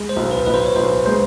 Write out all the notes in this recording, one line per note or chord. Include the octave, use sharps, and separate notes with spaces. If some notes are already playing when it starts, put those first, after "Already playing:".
Already playing: G#3
C5
B1
B4
B1 B4
C5
C#5
B1 C5
G#3 C5